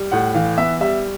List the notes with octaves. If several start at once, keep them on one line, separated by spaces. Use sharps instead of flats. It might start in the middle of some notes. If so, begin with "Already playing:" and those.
Already playing: G3
A2 F#5
E3 F5
B3 E5
G3 E5